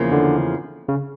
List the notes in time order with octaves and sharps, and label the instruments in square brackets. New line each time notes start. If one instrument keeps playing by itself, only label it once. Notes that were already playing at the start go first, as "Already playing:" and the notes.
Already playing: [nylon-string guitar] E2 C#3 F3 A#3
[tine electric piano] D3
C#3